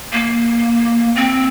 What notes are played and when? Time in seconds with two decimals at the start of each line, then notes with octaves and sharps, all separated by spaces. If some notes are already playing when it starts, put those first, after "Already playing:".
0.12 A#3
1.16 C4